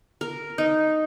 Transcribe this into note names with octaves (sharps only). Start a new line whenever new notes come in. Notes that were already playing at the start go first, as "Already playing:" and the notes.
A#4
D#4